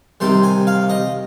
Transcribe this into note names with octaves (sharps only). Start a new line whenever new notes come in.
C3 D#3 G3 C6
G#5
F5
D#5